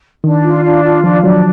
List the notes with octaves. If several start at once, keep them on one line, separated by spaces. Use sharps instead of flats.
D#3 D4
F4
D4
F4
F3 D4
F#3 D4